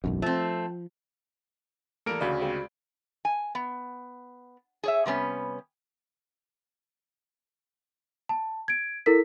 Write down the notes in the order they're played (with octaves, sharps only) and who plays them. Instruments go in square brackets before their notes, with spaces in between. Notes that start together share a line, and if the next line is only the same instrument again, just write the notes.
[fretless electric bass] E1 B1 F#2
[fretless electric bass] F3 [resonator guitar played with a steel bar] A3 C4
[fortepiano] E2 G3 A#3 [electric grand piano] A4 A#4 D7
[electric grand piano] D2 C#3 [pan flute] F#4 [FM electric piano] D5 F5 B5
[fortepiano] G3 G#3 C4
[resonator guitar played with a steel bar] G#5
B3
G#4 C#5 E5
C3 G3 B3 C#4
[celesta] A5
G#6 D7
E4 A4 A#4 B6